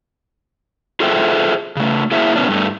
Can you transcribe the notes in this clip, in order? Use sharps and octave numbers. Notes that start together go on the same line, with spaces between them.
F4 G#4 A4 C5 E5 G5
C#3 A3
A#3 E4 G#4 C5 E5
A#2 C#3 B3 C#4 D4
G2 A3